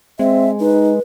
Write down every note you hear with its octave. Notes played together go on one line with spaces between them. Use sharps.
G#3 C4 E5
D#4 B4